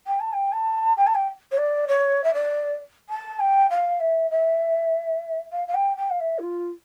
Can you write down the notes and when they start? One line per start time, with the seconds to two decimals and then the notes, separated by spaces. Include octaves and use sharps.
0.06 G5
0.20 A5
0.32 G5
0.52 A5
0.97 G5
1.06 A5
1.14 G5
1.51 C#5
1.57 D5
1.88 C#5
2.23 E5
2.33 D5
3.09 A5
3.39 G5
3.70 F5
4.00 E5
4.30 E5
5.51 F5
5.67 F5
5.74 G5
5.96 G5
6.10 F5
6.20 E5
6.38 E4
6.42 F4